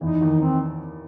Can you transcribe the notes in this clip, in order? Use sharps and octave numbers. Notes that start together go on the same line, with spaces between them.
E2 E3 D#4
D#2 D#3
C4